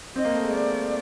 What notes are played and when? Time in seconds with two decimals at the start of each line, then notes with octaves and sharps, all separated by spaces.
0.15 C4 D#5
0.25 A#3
0.35 A3
0.45 G#3
0.54 A3 D5